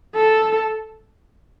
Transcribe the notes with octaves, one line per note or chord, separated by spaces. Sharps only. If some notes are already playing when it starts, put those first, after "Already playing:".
A4